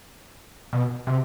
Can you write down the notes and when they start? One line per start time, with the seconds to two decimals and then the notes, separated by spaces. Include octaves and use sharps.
0.73 B2
1.07 C3